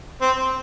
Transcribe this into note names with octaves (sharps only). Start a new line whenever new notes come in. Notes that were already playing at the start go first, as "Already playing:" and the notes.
C4